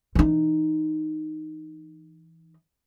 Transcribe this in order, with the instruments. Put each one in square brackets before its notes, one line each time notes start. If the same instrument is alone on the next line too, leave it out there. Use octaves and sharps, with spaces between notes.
[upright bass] E3 D#4